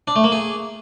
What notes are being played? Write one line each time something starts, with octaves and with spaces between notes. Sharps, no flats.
D4
A3
A#3
G#4